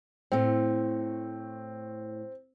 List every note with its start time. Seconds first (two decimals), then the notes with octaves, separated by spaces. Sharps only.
0.32 A2 A3 C4